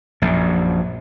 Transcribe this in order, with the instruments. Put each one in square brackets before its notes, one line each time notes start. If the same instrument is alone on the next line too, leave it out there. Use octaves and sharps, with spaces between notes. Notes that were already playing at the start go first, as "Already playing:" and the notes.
[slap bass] A#1 F#2